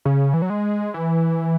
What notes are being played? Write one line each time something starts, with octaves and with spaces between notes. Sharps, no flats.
C#3
E3
F#3
G#3
E3